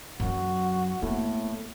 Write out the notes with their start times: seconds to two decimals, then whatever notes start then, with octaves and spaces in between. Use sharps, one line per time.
0.20 F#2 F#3 F#4
1.02 A2 A#3 B3